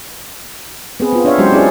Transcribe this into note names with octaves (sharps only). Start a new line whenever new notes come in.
B3 C4 G#4 B4
B3 F4
D4 C#5 E5 F5
F#3 G#3 C#4 F4 G4 C5
C#4 E4 G#4 D5